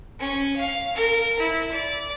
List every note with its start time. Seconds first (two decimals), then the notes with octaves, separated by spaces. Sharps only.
0.19 C#4
0.56 F5
0.95 A#4
1.39 E4
1.71 D5